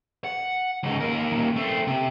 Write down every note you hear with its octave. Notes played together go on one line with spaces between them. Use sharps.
F#5
C#2 D#4
D#2 A#4
D#2 A#2
A3 C4
C3